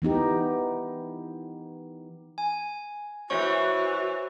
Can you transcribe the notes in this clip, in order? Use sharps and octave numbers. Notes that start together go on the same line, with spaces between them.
E3 B3 D#4 G4
G#5
E3 F#4 C5 C#5 C#6